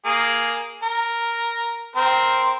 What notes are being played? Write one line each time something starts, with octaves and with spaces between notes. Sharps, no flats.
A#3 G#4
A#4
C4 A#4 C5